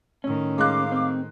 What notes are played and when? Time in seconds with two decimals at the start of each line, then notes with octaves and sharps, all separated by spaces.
0.24 A2 D#3 C#4
0.58 G#3 F5 D6 F#6
0.92 C4